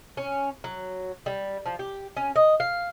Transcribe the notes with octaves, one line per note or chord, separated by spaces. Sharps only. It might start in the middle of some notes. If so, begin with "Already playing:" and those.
C#4
F#3
G3
F3
G4
C#4
D#5
F5